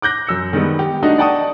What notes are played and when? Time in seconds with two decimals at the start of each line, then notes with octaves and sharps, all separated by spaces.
0.02 D6 F#6 G6 A#6
0.27 F#2 E6 C#7
0.53 D#3 G3 G#3 B3
0.79 G4
1.03 A3 D4 D#4 F#4 D#5
1.18 D5 F#5 G5 A5 C#6 D#6